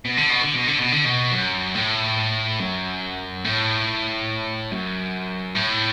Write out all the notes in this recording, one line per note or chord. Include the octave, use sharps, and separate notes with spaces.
B2
D3
B2
D3
B2
D3
B2
D3
B2
F#2
A2
F#2
A2
F#2
A2